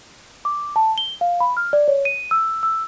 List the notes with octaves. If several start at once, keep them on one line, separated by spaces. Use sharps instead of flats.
D6
A5
G7
F5
B5
F6
D5
C#5
D#7
E6
E6